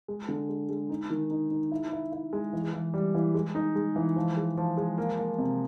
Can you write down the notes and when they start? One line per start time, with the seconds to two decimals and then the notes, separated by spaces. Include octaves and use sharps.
0.08 G#3
0.29 D3
0.49 G#3
0.69 G#3
0.89 D#4
1.10 D#3
1.30 D#4
1.51 D#4
1.72 E4
1.92 E4
2.12 E4
2.33 G#3
2.53 E3
2.73 E3
2.94 G3
3.15 E3
3.34 G#3
3.55 D#4
3.76 G#3
3.96 E3
4.16 F3
4.37 G#3
4.57 F3
4.77 G#3
4.98 A#3
5.18 A#3
5.38 C3